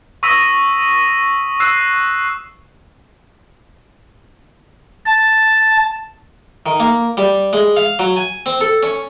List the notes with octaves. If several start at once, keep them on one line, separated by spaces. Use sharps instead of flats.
C#6 D#6 E6 A#6 B6 D#7
E6 F#6 C7 E7
A5
D#3
A#3
G3
G#3
F5
F#3
G#5
C4
A4
C#4